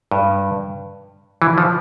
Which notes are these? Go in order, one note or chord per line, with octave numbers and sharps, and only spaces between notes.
G2
E3
F3